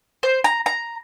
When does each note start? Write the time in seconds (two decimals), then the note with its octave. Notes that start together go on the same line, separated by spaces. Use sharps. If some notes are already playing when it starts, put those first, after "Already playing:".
0.23 C5
0.44 A#5
0.66 A#5